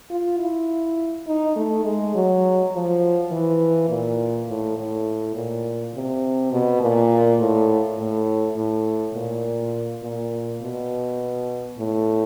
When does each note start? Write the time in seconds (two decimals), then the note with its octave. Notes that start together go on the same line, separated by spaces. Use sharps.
0.11 F4
0.39 E4
1.27 D#4
1.56 A3
1.85 G#3
2.15 F#3
2.72 F3
3.31 E3
3.89 A#2
4.48 A2
4.78 A2
5.35 A#2
5.94 C3
6.52 B2
6.81 A#2
7.39 A2
7.99 A2
8.56 A2
9.14 A#2
10.03 A#2
10.61 B2
11.78 A2